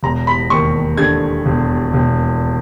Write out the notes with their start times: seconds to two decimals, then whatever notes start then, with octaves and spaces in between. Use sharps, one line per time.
0.03 E1 A#5
0.27 B5
0.50 D#2 C#6
0.97 D3 G#6
1.46 E1
1.94 E1